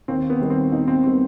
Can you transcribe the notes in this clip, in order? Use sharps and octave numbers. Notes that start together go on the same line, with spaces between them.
D#2 C4
B3
D#3 G3 B3
C4
D#2 D#4
C4
D#3 G3 B3 C4